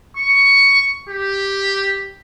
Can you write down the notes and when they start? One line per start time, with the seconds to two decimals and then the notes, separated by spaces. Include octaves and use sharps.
0.17 C#6
1.09 G4